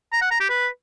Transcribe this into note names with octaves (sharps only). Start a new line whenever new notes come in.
A#5
F#5
A#5
G4
B4